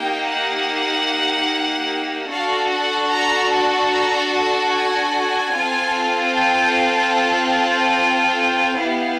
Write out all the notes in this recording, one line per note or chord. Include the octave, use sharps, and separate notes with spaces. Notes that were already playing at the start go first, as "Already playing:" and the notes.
Already playing: A#3 D#4 G4 G5
F#5
D4 F#4 A4 F5
F#5
A#5
A5
A#5
A5
G#5
C4 F4 A4
G5
G5
B3 E4 G4 F5